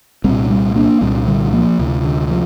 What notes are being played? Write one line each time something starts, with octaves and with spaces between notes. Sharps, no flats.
C2 A#2 G3 C4
G3 C4
A#3 D4
C2 A#2 G3 C4
D3 G3
F3 A#3
D2 C3
D3
F3